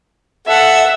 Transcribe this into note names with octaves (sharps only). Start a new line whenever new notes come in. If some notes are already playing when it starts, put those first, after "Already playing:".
A4 E5 F#5